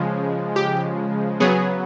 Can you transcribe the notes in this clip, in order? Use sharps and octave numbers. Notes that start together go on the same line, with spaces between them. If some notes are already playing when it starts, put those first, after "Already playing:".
Already playing: C#3 F3 G#3
G4
C#3 F#3 B3 G#4